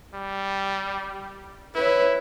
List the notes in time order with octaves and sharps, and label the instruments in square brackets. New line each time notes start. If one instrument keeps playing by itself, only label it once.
[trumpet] G3
[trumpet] E4 [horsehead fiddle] B4 C#5